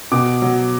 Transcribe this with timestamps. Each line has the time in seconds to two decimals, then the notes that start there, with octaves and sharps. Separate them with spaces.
0.12 B2 D6
0.42 F#3